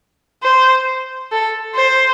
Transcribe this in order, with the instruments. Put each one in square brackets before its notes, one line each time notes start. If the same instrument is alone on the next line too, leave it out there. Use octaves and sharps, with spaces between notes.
[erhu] C5
A4
C5